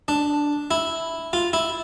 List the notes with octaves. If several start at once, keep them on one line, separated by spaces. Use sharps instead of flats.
D4
E4
F4
E4